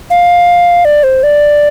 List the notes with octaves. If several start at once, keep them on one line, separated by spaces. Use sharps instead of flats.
F5
D5
C5
D5